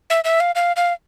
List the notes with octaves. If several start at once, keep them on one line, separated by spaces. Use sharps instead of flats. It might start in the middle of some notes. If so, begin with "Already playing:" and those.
E5
E5
F5
F5
F5